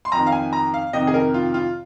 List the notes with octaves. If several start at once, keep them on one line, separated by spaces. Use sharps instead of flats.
C6
F2 D#3 A#5
F5
G#5
A#5
F5
F2 C3 D#3 D#5
G#4
A#4
F4
F4